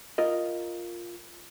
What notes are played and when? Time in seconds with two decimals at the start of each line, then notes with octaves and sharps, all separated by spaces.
0.18 F4 A#4 D#5